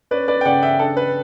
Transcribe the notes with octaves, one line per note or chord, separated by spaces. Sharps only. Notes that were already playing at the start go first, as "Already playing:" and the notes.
C#4 B4 D5
B4 D5
G5
C#3 D5 F#5
E5 G5
D4 A4
B4